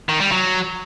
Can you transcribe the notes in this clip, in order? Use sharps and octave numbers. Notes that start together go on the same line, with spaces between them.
D#3
G3
F#3